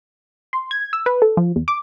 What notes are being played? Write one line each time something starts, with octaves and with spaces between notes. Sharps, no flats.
C6
G#6
E6
B4
A4
F3
E2
D6